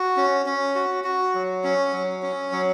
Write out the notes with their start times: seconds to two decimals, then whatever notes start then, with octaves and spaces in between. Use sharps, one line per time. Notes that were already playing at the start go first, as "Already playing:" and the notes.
Already playing: F#4
0.17 C#4
0.46 C#4
0.75 F#4
1.04 F#4
1.35 F#3
1.64 C#4
1.93 F#3
2.23 C#4
2.52 F#3